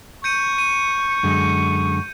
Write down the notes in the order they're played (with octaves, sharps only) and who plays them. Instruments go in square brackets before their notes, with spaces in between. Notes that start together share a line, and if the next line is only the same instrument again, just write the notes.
[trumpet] C#6 [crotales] G6 C#7 D#7
[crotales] D#7
[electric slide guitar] F#2 D3 G#3